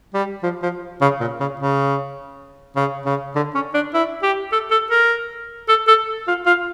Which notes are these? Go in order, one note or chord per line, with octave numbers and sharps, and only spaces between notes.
G3
F3
F3
C#3
A#2
C#3
C#3
C#3
C#3
D3
C#4
D4
E4
G4
A4
A4
A#4
A4
A4
F4
F4